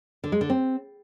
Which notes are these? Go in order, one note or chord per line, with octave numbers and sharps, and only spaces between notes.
D3
G#3
D3
C4